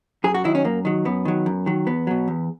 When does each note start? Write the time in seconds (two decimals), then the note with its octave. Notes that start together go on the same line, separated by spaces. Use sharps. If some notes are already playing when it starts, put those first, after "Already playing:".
0.24 F#2 G#4
0.34 F#4
0.44 D#3 F#3 E4
0.55 C#4
0.64 F#2 A#3
0.85 D#3 F#3
1.05 F#2 B3
1.25 D#3 F#3
1.46 F#2
1.66 D#3 F#3
1.87 E2 B3
2.07 B2 F#3
2.28 E2